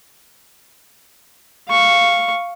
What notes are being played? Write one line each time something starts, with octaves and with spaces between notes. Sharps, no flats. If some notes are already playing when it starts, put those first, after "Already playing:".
F5 C#6